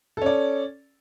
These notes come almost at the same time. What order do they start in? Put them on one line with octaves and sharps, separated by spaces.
A4 C#4 D5